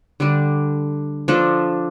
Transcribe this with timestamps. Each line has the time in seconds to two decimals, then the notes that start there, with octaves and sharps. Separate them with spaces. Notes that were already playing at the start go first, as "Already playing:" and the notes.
0.20 D3 G3 D4
1.28 F3 D4 A4